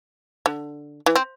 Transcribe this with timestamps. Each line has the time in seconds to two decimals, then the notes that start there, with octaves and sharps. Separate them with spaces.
0.46 D3
1.06 E3
1.15 C4